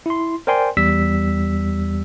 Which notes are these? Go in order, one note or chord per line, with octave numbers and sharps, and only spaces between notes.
E4 C6
A#4 C5 D5 G5 G#5 C6
E2 G3 E6 B6